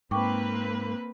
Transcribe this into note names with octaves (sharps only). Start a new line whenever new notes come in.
G#2 A#3 C4 B4 G5 C#6 D6